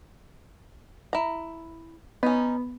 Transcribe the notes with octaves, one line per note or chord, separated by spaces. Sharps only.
E4 A#5
B3 C#4 D#4